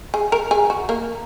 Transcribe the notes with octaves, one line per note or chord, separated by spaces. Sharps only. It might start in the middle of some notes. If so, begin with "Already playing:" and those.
G#4
A#4
G#4
F#4
A#3